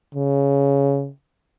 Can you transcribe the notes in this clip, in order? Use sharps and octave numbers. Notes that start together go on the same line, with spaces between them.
C#3